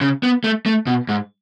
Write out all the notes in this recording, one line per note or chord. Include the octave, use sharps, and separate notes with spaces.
C#3
B3
A3
A3
B2
G#2